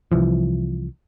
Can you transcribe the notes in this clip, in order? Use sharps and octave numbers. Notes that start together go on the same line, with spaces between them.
C2 E3 F3